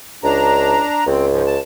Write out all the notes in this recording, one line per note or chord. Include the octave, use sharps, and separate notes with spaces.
C#2 D4 A#5
C#2 C4
G#2 F3
A5